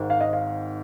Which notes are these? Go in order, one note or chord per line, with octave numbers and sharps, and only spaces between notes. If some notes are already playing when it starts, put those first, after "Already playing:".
Already playing: G#1 G#2 D#3
F5
D#5
F5